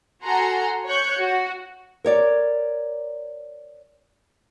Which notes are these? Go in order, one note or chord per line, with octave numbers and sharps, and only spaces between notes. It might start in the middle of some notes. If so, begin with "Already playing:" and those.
F#4 A4 F#5 G#5 A#5 C6
C#5 C#6 F#6 G6
F#4
A#4 C#5 D5